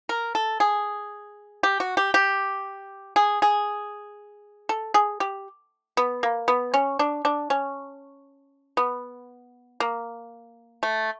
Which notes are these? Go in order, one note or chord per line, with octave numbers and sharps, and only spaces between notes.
A#4
A4
G#4
G4
F#4
G4
G4
G#4
G#4
A4
G#4
G4
B3
A#3
B3
C#4
D4
D4
C#4
B3
A#3
A3